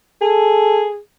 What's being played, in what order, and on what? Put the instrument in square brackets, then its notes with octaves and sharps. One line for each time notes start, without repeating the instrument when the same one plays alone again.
[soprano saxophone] G#4 [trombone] A4